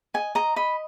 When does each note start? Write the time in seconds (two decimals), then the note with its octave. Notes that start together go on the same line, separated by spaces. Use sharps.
0.14 D#5 G#5
0.35 D#5 A#5
0.56 D#5 B5